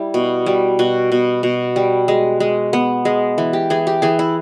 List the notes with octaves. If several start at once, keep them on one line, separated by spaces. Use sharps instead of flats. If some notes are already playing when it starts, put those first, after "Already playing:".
Already playing: G3 E4
B2
G3
B2 F#4
B2
B2
G3
G#3
G#3
B3
G#3
E3
G4
E3 G#4
G4
E3 G#4
E4